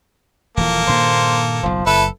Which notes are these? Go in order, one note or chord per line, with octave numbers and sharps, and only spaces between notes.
D#1 E3 F3 A#3 A4
G2 A#2 D#3 C5
F#1 B1 F3
F#1 E4 A4 B4